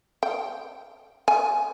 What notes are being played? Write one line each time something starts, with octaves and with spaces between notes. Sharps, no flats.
G5
G#5